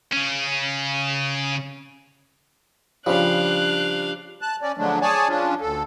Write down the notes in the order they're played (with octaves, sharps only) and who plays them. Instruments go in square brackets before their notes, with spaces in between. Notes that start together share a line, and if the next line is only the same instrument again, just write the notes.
[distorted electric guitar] C#3 C#4
[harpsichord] C#3 F3 [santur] G3 [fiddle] D4 F5 [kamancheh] F#6
[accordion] A5 F#6
C#4 D5
D3 F3 F#3 G#3 A3 D4
G#4 C#5 D5 G#5 A5
F3 C#4 D4 F4
D2 A4